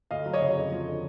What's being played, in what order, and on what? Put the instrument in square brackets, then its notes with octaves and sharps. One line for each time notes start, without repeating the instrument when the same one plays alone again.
[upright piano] D2 D#5 F5
F#3
C#5 D#5
C#3
F2
F3
D3